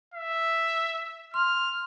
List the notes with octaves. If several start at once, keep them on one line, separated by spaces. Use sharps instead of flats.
E5
C6 F6